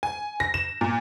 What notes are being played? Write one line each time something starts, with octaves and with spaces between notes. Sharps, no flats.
G#5
A#6
E7
A#2